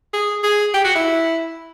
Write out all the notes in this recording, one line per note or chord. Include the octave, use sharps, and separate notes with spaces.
G#4
G#4
G4
F#4
E4